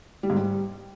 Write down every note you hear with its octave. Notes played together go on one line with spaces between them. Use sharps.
G3
G#2
G3